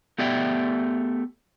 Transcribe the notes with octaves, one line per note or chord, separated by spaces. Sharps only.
A3 B3 G4 D5 E5 G5